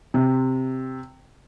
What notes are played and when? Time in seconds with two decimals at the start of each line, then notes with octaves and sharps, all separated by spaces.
0.14 C3